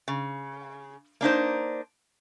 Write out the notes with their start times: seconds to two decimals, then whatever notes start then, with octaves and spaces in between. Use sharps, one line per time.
0.08 C#3
1.21 A#3 D4 D#4 C5